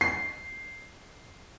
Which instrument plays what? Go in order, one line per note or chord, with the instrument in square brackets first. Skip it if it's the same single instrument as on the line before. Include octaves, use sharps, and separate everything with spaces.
[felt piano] C7